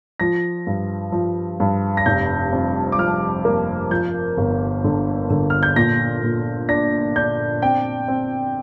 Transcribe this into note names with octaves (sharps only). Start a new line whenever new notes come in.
F3 A#6
G2
F3
G2
A#6
F1 G6
F2
D6
F3 F6
A#3
F3 G6
G1
D3
D3
F6
G6
A#2 A#6
A#2
D4 A#6
D4 G6
C4 G5
C4